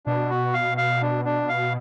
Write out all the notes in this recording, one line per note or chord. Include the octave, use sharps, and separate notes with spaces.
B2 D4
F#4
F5
F5
D4
D4
F5